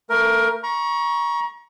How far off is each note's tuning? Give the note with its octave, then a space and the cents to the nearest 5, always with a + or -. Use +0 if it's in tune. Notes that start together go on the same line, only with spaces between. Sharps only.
A3 +35 A#4 +15
A#5 +35 C#6 +0